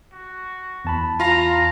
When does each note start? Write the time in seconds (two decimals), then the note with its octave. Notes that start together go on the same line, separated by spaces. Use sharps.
0.13 F#4
0.85 E2 A5 B5
1.20 F4 F5 A#5